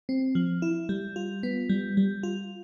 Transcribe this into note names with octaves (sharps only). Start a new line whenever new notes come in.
C4
F3
E4
G3
F4
B3
G3
G3
F4